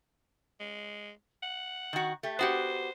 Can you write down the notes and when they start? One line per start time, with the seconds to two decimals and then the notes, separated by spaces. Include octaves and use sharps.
0.60 G#3
1.43 F#5
1.93 D#3 F#4
2.23 A3 G4
2.39 B3 F#4 G4 C5